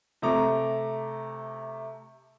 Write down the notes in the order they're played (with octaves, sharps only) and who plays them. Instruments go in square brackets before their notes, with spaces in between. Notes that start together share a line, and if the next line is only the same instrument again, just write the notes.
[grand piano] C3 A3 A#5 D6